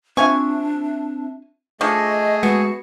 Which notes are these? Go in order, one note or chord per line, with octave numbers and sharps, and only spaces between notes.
C4 D4 F4 E5 G#5 C#6
F3 A3 D4 D#4 G#4 D#5 C#6
G#3 B3 F#4 C#7